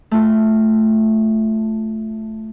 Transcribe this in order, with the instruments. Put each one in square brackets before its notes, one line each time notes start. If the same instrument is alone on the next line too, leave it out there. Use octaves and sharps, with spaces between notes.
[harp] A3 F4